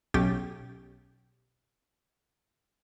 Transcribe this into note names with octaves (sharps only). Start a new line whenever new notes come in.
B1 C#4 G4 A6